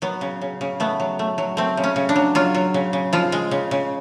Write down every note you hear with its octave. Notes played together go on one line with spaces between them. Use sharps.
F#3 B3
C#3
C#3
C#3
A3 B3
F#3
A3
F#3
A3 C4
C#3
C#4
C#3
D4
F#3
F#3 F4
F#3
C#3
C#3
F3 F4
G#3
C#3
C#3